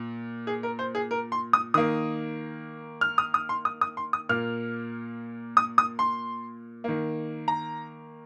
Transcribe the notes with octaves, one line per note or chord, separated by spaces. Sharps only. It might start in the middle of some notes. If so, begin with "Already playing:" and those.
Already playing: A#2
G#4
A#4
C5
G#4
A#4
C6
D#6
D#3 A#3 D#6
F6
D#6
D#6
C6
D#6
D#6
C6
D#6
A#2 A#3 F6
D#6
D#6
C6
D#3 A#3
A#5